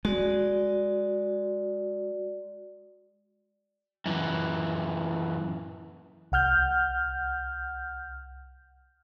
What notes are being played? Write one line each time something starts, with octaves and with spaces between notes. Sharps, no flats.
G#3 F#4 D5
F#2 E3
C2 F#5 F6 G6